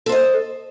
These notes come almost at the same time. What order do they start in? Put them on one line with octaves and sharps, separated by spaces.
A4 C5 D#5